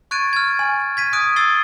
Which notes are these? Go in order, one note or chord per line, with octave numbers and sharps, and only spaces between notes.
C#6 F#6 G#6 A6 D7 D#7
F6 G#6
G#5
G#6 B6 D#7
D#6 F#6 D7 D#7
D#6 E6 A6 C7 G7